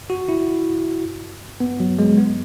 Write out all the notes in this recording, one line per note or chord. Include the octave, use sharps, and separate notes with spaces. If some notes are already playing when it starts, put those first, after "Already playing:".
F#4
E4
B3
F#3
G#3
B3